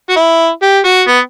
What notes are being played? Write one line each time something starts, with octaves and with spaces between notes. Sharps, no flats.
F#4
E4
G4
F#4
B3